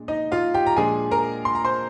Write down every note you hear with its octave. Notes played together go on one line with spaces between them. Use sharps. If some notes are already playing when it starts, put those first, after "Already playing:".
Already playing: A#2 G#3 D4
D#4 D#5
F4 F5
G4 G5
A#5
A#2 F3 G#3 D4 G#4 G#5
A#4 A#5
C6
A#5
C5 C6